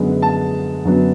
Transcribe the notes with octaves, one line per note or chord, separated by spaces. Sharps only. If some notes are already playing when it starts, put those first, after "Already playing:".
Already playing: F#2 D3 G#3 B3
A5
F#2 D3 F#3 B3